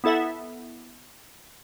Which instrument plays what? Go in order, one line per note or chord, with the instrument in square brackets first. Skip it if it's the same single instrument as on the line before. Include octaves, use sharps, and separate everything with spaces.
[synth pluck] B3 E4 A4 E5 F#5